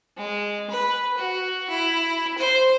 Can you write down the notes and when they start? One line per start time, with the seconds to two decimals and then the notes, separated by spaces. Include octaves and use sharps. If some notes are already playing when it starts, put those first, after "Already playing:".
0.17 G#3
0.70 B4
1.17 F#4
1.70 E4
2.38 C5